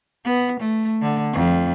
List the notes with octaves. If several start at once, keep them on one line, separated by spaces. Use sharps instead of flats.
B3
A3
D3
F2